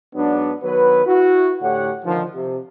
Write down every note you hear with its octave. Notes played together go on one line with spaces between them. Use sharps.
G#2 F#3 B3 D4
D#3 F#3 B3 B4
E4 F#4
A2 D3 A3 G4 C#5 F#5
D3 D#3 F3
C3